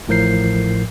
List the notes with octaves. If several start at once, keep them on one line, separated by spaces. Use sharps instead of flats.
A1 A2 F3 A#4 G6 C7